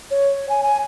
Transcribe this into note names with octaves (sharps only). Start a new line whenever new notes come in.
C#5
G#5
G#5